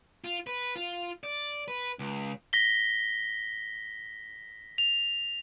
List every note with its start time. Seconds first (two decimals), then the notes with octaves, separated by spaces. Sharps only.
0.24 F4
0.47 B4
0.76 F4
1.23 D5
1.68 B4
1.99 C#2
2.53 A#6 B6 G7
4.78 F7